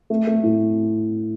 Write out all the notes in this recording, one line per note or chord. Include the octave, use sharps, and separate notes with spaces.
A3
A3
A2